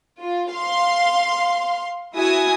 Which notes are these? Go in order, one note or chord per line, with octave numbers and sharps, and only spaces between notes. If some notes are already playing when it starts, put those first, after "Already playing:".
F4
F5 C6
E4 F#4 E5 G#5 D#6